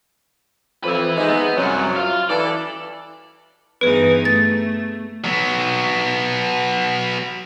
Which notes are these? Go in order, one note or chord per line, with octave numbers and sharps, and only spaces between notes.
F2 F3 B4 E5
G#3 D#4
B3
C2 F#2 F#3
F4 F5
E3 A4 D5
G2 E3 B3 D#4 G#4 B4
A3 A6
F#3 B3